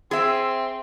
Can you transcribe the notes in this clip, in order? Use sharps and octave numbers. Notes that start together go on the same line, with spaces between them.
C4 G#4 E5